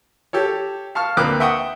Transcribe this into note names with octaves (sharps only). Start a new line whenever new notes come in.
G4 A4 C#5
F5 A5 C#6 F6
D2 A#3 C4 B4 D6 F#6
E5 F#5 G5 C#6 D#6